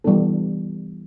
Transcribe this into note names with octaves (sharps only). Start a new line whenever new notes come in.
E3 G3 B3 D4 A4